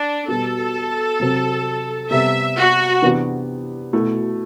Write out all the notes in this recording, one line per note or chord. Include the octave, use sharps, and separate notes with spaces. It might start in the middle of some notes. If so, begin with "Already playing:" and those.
Already playing: D4
B2 G3 B3 A4
C3 F#3 C4
C3 G3 B3 E5
F#4
C3 E3 B3 D4 G4
B2 A3 E4